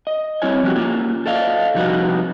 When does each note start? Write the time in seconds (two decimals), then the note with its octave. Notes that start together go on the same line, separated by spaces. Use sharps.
0.07 D#5
0.42 G3 C4 E4 C#5 G#5
0.63 F3 G3 B3 F#4 G4
0.76 A#3 C#4 F4
1.26 A4 D5 D#5 F5
1.74 C3 F3 G3 D#4 F#4 B4